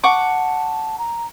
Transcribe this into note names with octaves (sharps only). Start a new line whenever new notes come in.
F#5 A5 C#6 D6
A#5